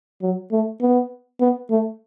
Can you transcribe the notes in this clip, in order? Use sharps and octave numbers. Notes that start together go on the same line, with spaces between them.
F#3
A3
B3
B3
A3